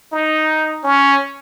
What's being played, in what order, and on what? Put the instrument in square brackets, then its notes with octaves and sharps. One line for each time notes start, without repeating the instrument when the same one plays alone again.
[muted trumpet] D#4
C#4